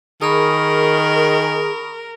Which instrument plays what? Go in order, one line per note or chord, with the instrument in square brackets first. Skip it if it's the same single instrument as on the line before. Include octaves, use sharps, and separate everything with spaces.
[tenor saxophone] D#3 [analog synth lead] G#4 [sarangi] A#4 [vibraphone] B5 C#6 D#6